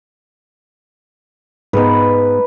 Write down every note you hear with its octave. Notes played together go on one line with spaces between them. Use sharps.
G#2 G#3 B3 D#4 B4